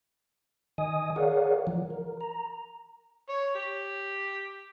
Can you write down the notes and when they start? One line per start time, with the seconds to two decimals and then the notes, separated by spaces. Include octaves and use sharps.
0.78 D#3 D#5 G#5 D#6
1.16 G#4 A#4 C#5 D5 F5 F#5
1.67 E3 F3
1.90 A#4
2.21 A#5
3.29 C#5
3.55 G4